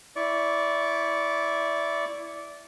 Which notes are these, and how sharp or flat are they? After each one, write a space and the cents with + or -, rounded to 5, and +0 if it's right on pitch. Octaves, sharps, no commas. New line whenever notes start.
E4 +0 D5 -15 C#6 +0